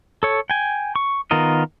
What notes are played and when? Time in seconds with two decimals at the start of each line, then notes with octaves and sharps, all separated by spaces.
0.23 A4 C#5
0.50 G5 G#5
0.96 C#6
1.31 D#3 B3 F4 A#4 D#5